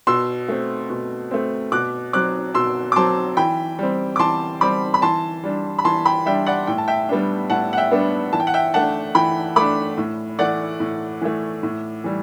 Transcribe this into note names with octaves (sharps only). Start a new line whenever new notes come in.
B2 C6 E6
A3 C4
B2
A3 C4
B2 D6 F#6
F#3 C4 D6 F#6
B2 C6 E6
D6
F#3 C4 A5 C6
E3 G5 B5
G3 C4
D6
E3 A5 C6
G3 C4 B5 D6
B5
E3 A5 C6
G3 D4
B5
E3 A5 C6
G5 B5
G3 D4 E5 G5
D5 F#5
A2 G5
A5
E5 G5
G3 B3 D4
A2 F#5 A5
F#5
E5 G5
G3 B3 D4
E3 A5
G5
F#5
E5 G5
A3 D4 F#5 A5
E3 G5 B5
A3 D4 B5 D6
A2
E3 A3 D5 F#5
A2
E3 A3
A2
E3 G3